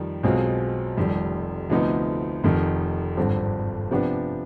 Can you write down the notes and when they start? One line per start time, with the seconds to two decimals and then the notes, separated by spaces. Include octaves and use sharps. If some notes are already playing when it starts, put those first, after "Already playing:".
Already playing: F2 D#3 G3
0.23 B1 B2 G#3 C4 F4
0.97 F1 F2 D#3 G3
1.70 D2 C3 F3 B3 D#4
2.44 F1 F2 D#3
3.17 G#1 G2 D3 F3 C4
3.91 C3 F3 B3 D4 G4